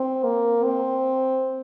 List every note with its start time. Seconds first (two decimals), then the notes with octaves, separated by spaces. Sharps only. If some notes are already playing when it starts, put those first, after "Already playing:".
Already playing: C4
0.24 A#3
0.64 C4